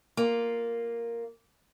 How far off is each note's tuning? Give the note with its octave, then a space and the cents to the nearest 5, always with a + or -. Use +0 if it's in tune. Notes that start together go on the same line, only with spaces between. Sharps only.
A#3 +0 F4 +0